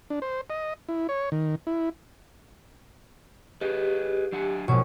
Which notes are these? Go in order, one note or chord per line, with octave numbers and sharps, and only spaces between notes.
D4
C5
D#5
E4
C#5
D#3
E4
G4 G#4 B4 D#5
F#3 D4 F#5
A#1 G#2 B2 F#3 C#5 C#6